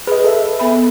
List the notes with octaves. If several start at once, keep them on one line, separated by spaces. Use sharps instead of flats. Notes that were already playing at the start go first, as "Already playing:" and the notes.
G#4 B4 D#5
A4 E5
B3 B5